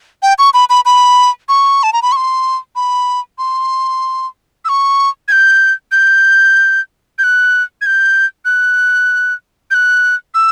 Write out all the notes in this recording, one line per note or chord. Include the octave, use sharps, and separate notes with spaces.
G5
C#6
B5
B5
B5
C#6
A5
A#5
B5
C#6
C6
B5
C6
E6
C#6
G#6
G6
G6
G6
F#6
G#6
G6
F#6
G6
F#6
E6